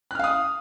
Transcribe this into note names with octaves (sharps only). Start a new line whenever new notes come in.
F5 D#6 F6 F#6